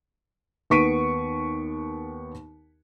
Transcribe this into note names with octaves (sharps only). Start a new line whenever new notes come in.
D#2 B3 C#6 B6 D7 D#7